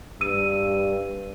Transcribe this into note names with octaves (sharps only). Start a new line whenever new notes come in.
G2 E6 D#7